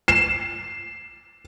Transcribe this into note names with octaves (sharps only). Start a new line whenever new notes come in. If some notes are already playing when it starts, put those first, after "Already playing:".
C7 E7